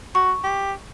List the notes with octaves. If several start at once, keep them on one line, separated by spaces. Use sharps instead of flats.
F#4 C#6
G4